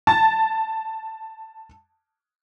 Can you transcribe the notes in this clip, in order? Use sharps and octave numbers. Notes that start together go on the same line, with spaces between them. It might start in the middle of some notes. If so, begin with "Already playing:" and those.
A5 A6